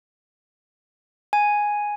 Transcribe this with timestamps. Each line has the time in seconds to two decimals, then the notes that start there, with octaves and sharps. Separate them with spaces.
1.33 G#5